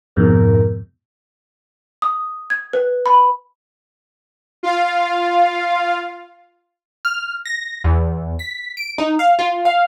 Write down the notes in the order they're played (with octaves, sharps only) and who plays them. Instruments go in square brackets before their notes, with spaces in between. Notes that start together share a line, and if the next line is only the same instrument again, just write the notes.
[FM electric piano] F2 G#2 B2 [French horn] A#4
[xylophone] D#6
G#6
B4
B5
[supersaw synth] F4 F5
[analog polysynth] F6
A#6
E2
B6
D7
D#4
F5
F4
F5